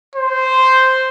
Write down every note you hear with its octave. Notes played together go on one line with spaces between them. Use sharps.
C5